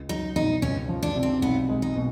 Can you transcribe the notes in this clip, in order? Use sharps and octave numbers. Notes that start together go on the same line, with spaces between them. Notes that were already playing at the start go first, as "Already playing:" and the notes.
Already playing: C#2
F#3 D#4
B2 D#4
C#2 C#4
F3
D4
C3
C4
B1 B3
G#3
D#4
B2